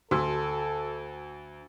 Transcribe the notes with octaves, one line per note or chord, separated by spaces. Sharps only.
D2 F#4 A4 E6